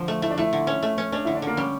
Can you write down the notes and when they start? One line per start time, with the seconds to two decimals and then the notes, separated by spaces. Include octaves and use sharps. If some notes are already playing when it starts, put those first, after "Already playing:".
Already playing: D3 F3
0.08 A3
0.22 A3 E4
0.30 D4
0.38 A3 E4
0.53 D3
0.67 C#4
0.83 A3
0.98 C#4
1.12 C#4 D4
1.25 D3 E4
1.35 D4
1.42 D3 A#3
1.57 G3 C#4